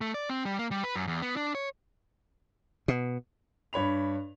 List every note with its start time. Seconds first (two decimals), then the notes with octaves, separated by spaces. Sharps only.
0.01 A3
0.14 D5
0.30 C4
0.45 G3
0.59 A#3
0.71 G3
0.84 B4
0.96 F#2
1.07 E2
1.22 B3
1.36 D4
1.55 C#5
2.88 B2
3.73 G2 C#5 B5 F7